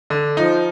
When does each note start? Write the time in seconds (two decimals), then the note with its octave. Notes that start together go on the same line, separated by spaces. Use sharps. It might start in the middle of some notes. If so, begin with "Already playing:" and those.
0.10 D3
0.37 F3 D#4